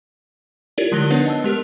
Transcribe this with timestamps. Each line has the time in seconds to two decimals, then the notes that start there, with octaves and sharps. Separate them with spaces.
0.78 E4 F4 G4 A#4 C#5 D5
0.92 D3 F3 G#3 F#6 A#6 G7
1.11 B3 D4 D#4 B4 C#5 F#5
1.26 D#5 A5 E6
1.44 G#3 G4 A#4 F6